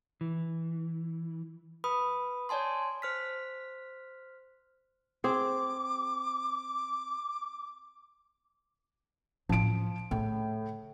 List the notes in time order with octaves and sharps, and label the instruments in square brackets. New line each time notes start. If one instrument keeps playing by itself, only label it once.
[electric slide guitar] E3
[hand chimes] B4 B5 D#6
C#5 D5 G#5 A5 C6
C5 F6 B6
[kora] C4 G#4 [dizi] D6
[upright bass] A2 C4 [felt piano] F3 D7
[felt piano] A2 [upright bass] C#3